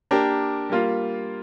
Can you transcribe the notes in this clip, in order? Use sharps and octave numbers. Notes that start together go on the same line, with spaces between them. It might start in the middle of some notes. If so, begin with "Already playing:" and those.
A#3 D4 G4 A#4
G3 A#3 F4